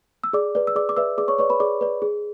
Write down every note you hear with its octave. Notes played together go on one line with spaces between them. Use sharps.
E6
G#4 D5 D6
B4 D5
E6
G#4 D5 D6
D6
B4 D5 E5 E6
G#4 D5 D6
C#5 C#6
B4 C#5 D5 C#6
B4 B5
G#4 D5 D6
B4 D5
G#4